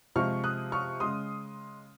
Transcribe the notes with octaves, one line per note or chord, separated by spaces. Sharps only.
C3 F3 G#3 C#6 F6
D#6 F#6
C#6 F6
C#3 G#3 C6 D#6